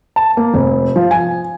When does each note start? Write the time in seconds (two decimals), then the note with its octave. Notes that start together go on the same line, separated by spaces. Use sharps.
0.16 A5
0.37 A#3
0.54 F1
0.96 F3
1.11 G#5